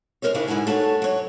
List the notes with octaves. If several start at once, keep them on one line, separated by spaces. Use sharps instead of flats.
G#3 C4 A#4 C5 C#5
C#3 D4 E4 G4 G#4 C#5
G#2 E4 F#4 G#5 A#5
A3 D4 F#4 C#5
F#3 C#5